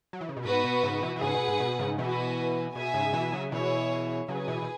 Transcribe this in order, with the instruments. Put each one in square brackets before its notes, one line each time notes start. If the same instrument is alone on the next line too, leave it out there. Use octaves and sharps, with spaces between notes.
[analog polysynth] F#3
E3
C#3
B2
[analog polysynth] G#2 [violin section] B3 F#4 B4
[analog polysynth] B2
G#2 C#3
B2 E3
E3
[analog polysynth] G#2 C#3 [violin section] G#4 B4 F#5
[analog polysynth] B2
G#2
B2
G#2 C#3
[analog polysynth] B2 E3 [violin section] B3 F#4 B4 G#5
[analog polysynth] B2 [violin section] G#4 E5 G#5
[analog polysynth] G#2 C#3
B2 E3
C#3 F#3
[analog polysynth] B2 E3 [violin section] E4 G#4 C#5
[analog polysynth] C#3 F#3 [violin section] G#4 B4 G#5
[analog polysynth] B2 E3
B2